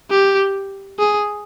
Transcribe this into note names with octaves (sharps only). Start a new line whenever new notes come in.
G4
G#4